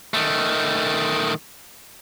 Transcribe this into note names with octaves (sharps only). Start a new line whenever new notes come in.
D#3 A3